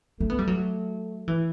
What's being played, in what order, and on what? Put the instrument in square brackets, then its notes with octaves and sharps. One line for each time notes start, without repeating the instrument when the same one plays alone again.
[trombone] A3 [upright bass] C4
[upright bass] B3
G3
F#3
E3